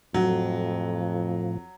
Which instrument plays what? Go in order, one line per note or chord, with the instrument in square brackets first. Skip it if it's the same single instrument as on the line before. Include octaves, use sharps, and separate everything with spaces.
[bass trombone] F2 [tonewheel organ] A2 F3 [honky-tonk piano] F#3